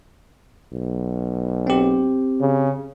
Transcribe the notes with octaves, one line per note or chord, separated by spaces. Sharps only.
B1
C4 G4
C#3